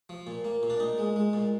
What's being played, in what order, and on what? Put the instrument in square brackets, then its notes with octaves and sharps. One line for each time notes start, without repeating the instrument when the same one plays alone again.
[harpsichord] F3
A#2
A#3
A#2
D4
A#2 D#4
G#3
G#3
A#2